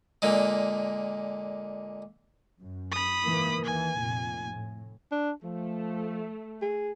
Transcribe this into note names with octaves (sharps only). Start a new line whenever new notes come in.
A#2 D3 G#3
F#2
B5 D#6
G#2 E3 A#3
D#2 E3 G#5
F1 A#2
A2
D4
F3 A3
G#4